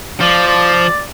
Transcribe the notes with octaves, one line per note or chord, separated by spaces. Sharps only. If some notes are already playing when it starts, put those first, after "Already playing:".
F3 D5
D5